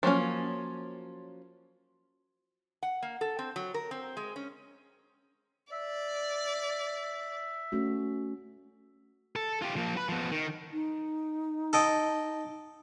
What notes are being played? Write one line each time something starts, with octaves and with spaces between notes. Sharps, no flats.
F3 F#3 A#3 C#4
F#5
A#3
A4
C4
F#3
A#4
C4
G#3
C#4
D5 E5
A3 C#4 F#4
A4
F4 G4
F3 A#3
B4
F3 B3
D#3
D#4
A4 D#5 G5